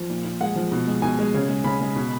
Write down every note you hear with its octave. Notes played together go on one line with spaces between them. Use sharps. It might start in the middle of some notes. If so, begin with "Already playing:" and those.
Already playing: F3
A#2
A#2
G#3 F#5
F3
B2
G#3
B2 G#5
G#3
C#3
G#3
C#3 B5
G#3
B2